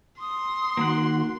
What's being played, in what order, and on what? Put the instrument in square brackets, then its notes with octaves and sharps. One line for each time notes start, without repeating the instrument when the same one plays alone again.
[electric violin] C6 [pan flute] D#6
[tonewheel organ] D#3 F#4 [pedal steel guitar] A#3 F#5